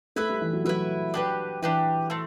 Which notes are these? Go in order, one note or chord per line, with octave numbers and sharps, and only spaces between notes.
A3 E4 B4 E5
G3
E3
F#3
F#3 E4 B4 E5
D4 G4 B4
E3 D4 G4 B4
A3 C4